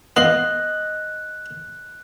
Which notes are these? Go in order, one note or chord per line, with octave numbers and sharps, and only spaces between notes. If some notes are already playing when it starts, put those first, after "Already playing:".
B3 F4 D#5 F5 F#6 F#7